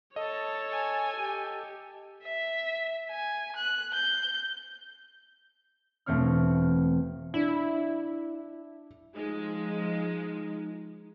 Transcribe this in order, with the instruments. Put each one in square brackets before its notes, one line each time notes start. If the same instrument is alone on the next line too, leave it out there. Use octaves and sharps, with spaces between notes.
[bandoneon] A4 [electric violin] C#5 A5 [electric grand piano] D#5
[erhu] G#5
[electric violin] G4
[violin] E5
G#5
F#6
G6
[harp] E1 A3 C4 C#5 F6
[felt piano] D4 [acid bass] E4
[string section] F3 G#3 [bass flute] D#4